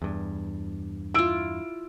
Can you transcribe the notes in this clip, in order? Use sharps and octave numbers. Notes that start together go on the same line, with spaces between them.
E2 G2
E4 F4 E6 D7